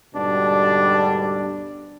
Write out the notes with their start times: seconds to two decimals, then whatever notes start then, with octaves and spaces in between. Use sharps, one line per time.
0.15 D2 G#2 B2 G3 D4